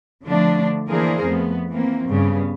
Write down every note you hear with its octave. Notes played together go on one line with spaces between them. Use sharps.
D3 F3 A3 D4
E3 A#3 D4 G#4 A#4 C5
F2 A3 B3
E3 A#3 C4
G2 C#3 B3